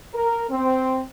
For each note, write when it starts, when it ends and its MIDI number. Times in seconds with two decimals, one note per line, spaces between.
0.13 0.43 70
0.50 1.01 60